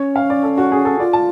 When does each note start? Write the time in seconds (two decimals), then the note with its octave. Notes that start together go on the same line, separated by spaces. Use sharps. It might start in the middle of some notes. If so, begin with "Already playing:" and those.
Already playing: C#4 C#5
0.16 F5
0.30 D5
0.43 A4
0.58 F#4
0.72 G#4
0.85 A4
0.99 F4 D5
1.13 A5